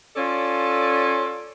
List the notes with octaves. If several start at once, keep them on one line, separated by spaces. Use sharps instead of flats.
C#4 F4 A4 D5